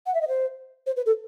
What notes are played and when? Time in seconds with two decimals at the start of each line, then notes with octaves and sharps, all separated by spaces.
0.06 F#5
0.14 E5
0.21 D#5
0.28 C5
0.86 C5
0.96 B4
1.06 A4